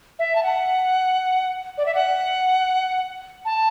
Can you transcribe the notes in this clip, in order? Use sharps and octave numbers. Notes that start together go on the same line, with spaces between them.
E5
A5
F#5
D5
E5
F#5
A5